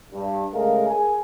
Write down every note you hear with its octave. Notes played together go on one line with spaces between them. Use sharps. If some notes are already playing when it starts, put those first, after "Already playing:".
G2
C#3 G#3 A3 A#4 F5
G#4 A#4 G#5